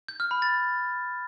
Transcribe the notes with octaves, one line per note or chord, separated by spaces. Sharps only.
G6
F6
B5
A6